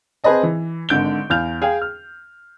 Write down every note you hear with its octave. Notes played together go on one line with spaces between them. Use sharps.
C4 G#4 B4 C5 D#5 A5
E3
G#1 G#2 D3 G6 D7 G7
E2 F5 F6 G6 F7
G#4 F5 G5
F6